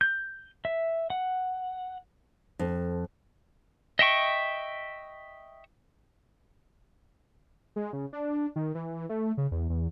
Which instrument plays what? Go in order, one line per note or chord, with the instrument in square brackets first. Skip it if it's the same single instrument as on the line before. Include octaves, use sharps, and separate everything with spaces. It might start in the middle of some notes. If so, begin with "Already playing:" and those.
[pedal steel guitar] G6
E5
F#5
[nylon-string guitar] F2
[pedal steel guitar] D#5 E5 G5 C#6
[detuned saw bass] G#3
C#3
D4
D#3
E3
A3
C#3
E2
E2